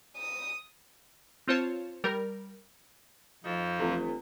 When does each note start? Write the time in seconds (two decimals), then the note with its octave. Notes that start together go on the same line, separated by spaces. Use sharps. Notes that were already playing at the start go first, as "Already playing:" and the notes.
0.17 D#6
1.47 C4 F4 C5 C#5 A5
2.04 G3 A#4
3.44 F2 F3 D#4
3.79 G1 E2 A3 C4